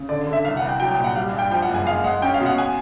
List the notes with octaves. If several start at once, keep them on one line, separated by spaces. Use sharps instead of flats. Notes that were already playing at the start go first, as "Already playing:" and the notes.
Already playing: C#3
D3 D5
D3
E5
C2 F5
F#5
C2
G5
F#3 G5
G5
A#1
F#5
G3 F5
G2
G5
F3 G5
F#5
F#1
G#5
G#3 F5
G#3 F#5
C#4 G5
F5
B2
F#5
G#5